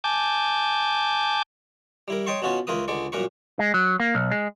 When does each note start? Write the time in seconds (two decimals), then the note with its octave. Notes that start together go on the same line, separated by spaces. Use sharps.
0.04 G#5 A5 D6 G6
2.08 G3 E4 A#4
2.26 C#5 D#5 G5 A5 C6 C#6
2.42 B2 B3 C#4 F4 F#4 A5
2.67 C#2 E4 F4 A#4 B4 D#6
2.88 C#2 D3 G#3 D5 C#6
3.12 F#2 A#2 A#3 A#4 B4 C#6
3.59 G#3
3.74 F#3
4.00 A#3
4.15 B1
4.31 G#3